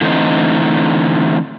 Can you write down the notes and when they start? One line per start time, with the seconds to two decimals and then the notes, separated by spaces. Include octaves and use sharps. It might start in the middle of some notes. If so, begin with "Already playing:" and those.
0.01 D3 E3 A3 C4 D#4